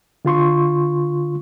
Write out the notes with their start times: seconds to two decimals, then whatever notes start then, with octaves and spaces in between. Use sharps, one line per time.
0.25 D3 F4 C6 C#6